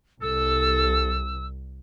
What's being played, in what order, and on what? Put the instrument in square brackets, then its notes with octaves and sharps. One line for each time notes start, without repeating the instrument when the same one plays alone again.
[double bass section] C2 [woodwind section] A4 [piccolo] E6